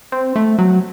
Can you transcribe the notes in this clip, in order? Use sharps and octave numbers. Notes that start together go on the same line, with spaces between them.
C4
A3
F#3